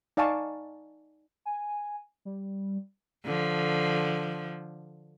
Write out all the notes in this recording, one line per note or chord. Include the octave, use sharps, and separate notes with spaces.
D#4 D5 F5 G#5 A5 C#6
G#5
G3
D3 F3